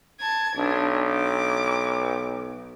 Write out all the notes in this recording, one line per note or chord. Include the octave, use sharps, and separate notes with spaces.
A5 G#6
B1 D4
D6